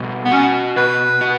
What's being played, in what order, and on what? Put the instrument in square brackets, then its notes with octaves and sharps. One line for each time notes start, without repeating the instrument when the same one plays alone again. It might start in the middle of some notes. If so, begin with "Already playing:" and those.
Already playing: [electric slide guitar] B2 G3
[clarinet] B3
[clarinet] C#4 [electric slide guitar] F#4
[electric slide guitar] B2 [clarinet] B4
[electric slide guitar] F#4